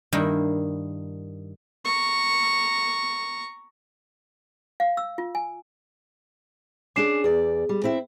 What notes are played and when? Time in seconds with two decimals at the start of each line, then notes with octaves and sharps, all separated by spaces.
0.13 G2 D#3 G3 A#3 E4
1.85 A#5 C#6
4.80 F5
4.97 E6
5.18 F4
5.35 G#5
6.96 C#4 D4 G#4 D6 C7 E7
7.24 E2 G#4 D5
7.69 G3
7.83 C4 E4 E5